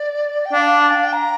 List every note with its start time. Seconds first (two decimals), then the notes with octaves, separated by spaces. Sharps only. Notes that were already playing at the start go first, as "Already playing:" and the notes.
Already playing: D5
0.44 G5
0.53 D4 F5
0.82 A5
0.90 G5
0.97 F5
1.04 G5
1.12 A#5